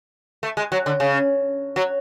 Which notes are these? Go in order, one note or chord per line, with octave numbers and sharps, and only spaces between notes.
A3
G#3
F#3
D3
C#3
F#3